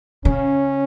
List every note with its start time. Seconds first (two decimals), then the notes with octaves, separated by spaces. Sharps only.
0.25 C#3 C#4